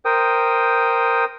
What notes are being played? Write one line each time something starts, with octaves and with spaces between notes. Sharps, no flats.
A#4 C5 G5 D#6